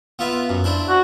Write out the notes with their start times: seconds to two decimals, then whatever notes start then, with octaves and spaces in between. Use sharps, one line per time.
0.19 B3 F4 E5
0.49 F#2
0.64 D4 E4 C5
0.89 F#4